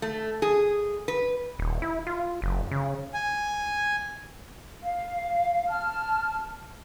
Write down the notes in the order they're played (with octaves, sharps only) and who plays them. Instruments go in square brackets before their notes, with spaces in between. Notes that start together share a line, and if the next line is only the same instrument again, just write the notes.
[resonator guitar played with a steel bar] A3
G#4
B4
[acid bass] D#1
E4
F4
F#1
C#3
[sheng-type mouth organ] G#5
[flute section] F5
A5 F6